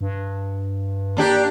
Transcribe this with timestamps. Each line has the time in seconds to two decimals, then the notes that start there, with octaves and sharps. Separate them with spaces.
0.01 G2
1.17 A#3 D4 G4